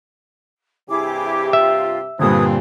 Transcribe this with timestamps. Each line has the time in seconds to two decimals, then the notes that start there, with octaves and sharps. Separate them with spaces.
0.89 G2 C3 E4 G4 G#4 D6
1.53 F4 E5
2.19 G2 A#2 D3 F3 C4 B4 D#6 G#6